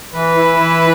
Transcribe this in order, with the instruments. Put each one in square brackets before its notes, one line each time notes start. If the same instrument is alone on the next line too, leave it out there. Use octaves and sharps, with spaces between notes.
[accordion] E3 [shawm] B4
[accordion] E4
E3